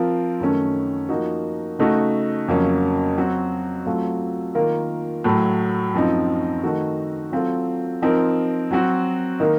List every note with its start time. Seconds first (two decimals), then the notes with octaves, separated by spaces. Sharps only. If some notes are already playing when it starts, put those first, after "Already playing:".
Already playing: F3 C4 F4 A#4
0.40 F#2 D#3 A3 C#4
1.09 F3 A#3 D#4 F#4
1.79 C#3 A3 D#4 F#4
2.48 F2 C#3 F#3 A#3 C#4
3.17 F#3 C4 F#4
3.86 F#3 A3 C4 F4
4.55 D#3 A#3 F4 A#4
5.24 A2 F#3 A3
5.94 F#2 F3 C4 D#4
6.63 D#3 A3 D#4 F#4
7.32 F#3 C4 F4 A4
8.02 F3 C4 D#4 A#4
8.71 F#3 C4 F#4
9.40 D#3 A#3 D#4 A#4